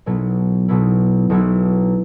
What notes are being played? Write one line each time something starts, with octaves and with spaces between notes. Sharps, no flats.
B1 B2 F#3 B3 E4
B1 B2 F#3 B3 E4
B1 B2 F#3 B3 E4